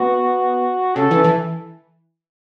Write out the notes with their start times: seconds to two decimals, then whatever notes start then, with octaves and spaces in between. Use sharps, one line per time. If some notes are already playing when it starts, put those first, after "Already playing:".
Already playing: B3 F#4
0.96 C#3 A4
1.11 E3
1.24 E3